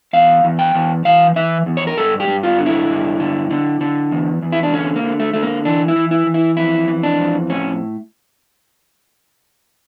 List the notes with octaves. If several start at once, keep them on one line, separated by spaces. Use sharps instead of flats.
E2 F5
E2
G5
E2
E3 F5
E3 E5
E2
C#5
A#4
G2 A4
G4
G2
F4
D3
E4
G2
D3
D3
D3
E2
E2
E4
D4
D3 C#4
A#3
D3
A3
D3 A3
A#3
E3 D4
E4
E3
E4
E3
E4
F2 E4
E3
D4
F2
A2 C#4